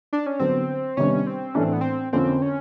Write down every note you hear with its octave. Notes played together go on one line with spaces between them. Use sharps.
D4
C#4
D3 F#3 B3 C4
C3 D#3 G3 B3 C#4 D4
C4
A2 E3 A3 C#4 D4
C4
B3
C4
F2 D3 F3 A#3 C4 C#4
C#4